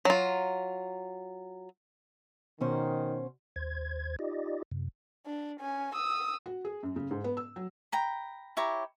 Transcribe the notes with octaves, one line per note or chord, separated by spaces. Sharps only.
F#3 F4
B2 D#3 C#4 C5
D#2 C5 G#6
D#4 F4 G4 D5 D#5
F#2 C3
D4
C#4 G#5
D#6 E6
F#4
G#4
F#2
C#3
G#2
B3
E6
F#3
G5 A#5 B5
E4 G4 C#5 A#5